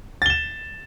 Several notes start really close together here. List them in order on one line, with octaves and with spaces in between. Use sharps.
A6 G7 E7